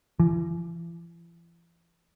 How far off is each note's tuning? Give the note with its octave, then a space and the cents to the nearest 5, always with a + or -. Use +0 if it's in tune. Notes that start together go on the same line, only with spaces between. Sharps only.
E3 +45